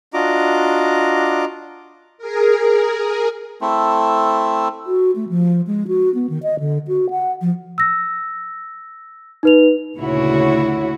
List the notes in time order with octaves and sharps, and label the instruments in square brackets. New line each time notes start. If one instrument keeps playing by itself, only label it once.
[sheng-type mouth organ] D4 F4 F#4 D#5 A#5 D6
[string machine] G#4 A#4
[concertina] A3 C4 E4 A4
[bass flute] F#4
A3
F3
G#3
F#4
B3
D#3
D#5
D3
F#4
F#5
F3
[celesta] E6 A#6
D#4 B4 F7
[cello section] D2 A#2 C#3 E4 F#4 C#5